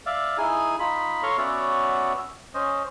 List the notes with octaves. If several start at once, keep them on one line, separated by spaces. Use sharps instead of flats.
D5 E5 F5
D#4 E4 G#4 G#5
D#4 F4 B5
A4 C#5 F5 A#5 C6 C#6
B3 C#4 F#4 C#5 D5 E5
C#4 C5 D#5